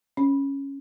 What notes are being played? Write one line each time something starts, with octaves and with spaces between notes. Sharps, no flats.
C#4